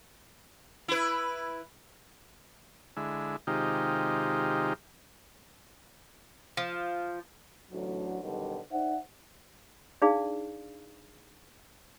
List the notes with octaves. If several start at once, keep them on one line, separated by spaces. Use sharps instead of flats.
E4 B4
D3 G#3 E4
C3 D#3 G#3 D#4 F4 G4
F3
A1 D2 D3 F#3
F#2 B2 D3 D#3 F#3 G3
D#4 C5 D5 E5 F#5
D4 D#4 G#4 D5 F5